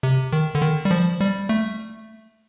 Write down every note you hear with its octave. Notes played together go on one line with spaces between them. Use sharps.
C3
D#3
D3
D#3
G3
F3
G3
A3